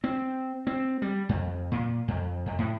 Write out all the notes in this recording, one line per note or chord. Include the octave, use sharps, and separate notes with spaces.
C4
C4
G3
F2
A#2
F2
F2
A2